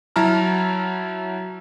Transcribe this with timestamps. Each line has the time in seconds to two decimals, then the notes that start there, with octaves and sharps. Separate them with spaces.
0.16 F#3 E4 A5 A#5 F6